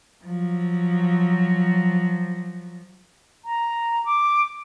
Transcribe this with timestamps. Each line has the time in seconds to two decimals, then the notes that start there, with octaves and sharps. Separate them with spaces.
0.25 F3 F#3
3.45 A#5
4.05 D6